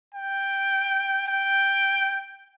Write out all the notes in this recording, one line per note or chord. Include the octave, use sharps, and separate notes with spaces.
G5
G5